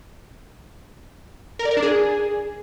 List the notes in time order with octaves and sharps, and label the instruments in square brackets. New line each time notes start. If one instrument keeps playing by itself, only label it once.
[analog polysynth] A#4
D5
A#4
D4
G#4